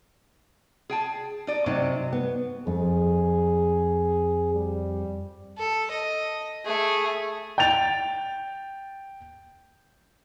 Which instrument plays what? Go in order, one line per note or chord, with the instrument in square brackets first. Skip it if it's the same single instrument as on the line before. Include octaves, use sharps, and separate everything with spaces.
[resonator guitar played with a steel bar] G#4 G5 A5
D#4 D5
[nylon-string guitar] C3 D#4 [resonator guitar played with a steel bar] F#3
[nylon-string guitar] B3
[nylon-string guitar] F2 [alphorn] G#4
[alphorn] G3
[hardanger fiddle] A4
D#5
A3 G#4
[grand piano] G5 G6 A6 F7